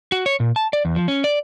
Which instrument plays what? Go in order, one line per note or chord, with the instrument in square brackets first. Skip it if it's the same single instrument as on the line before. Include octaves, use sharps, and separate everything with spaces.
[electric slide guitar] F#4
C#5
A#2
A5
D5
E2
F3
C#4
D5